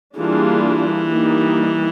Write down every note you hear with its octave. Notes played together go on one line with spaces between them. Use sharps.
E3 G3 A#3 D4 F4 G#4
G3 A#3 D#4